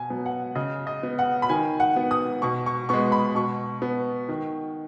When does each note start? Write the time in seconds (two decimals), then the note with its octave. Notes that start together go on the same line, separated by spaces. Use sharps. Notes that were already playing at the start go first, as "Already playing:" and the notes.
Already playing: B2 G#5
0.10 F#3 B3
0.26 F#5
0.55 C#3 D#5
0.87 D#5
1.03 B3
1.19 F#5
1.42 B5
1.49 D#3 G#5
1.80 F#5
1.96 B3
2.11 D#6
2.42 B2 C#6
2.66 C#6
2.89 G#3 B3 C#6
3.12 B5
3.35 B2 C#6
3.82 B3
4.29 D#3